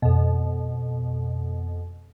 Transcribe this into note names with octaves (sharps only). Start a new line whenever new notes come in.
F2 B2